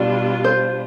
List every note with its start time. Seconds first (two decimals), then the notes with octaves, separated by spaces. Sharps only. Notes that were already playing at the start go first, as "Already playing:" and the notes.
Already playing: B2 G3 D4 F4 D5
0.44 C5